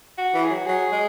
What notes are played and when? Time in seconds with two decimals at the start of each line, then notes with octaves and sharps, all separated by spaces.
0.18 F#4
0.34 E3
0.43 G#4
0.51 F#3 F#4
0.65 F#3 G#4
0.92 G#3